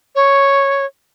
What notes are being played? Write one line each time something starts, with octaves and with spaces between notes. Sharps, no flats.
C#5